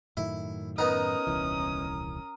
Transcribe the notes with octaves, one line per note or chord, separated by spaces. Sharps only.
F#2 A2 D#3 E4
B3 C#4 D#4 A#4 A#5 D#6
D#1 C2 E3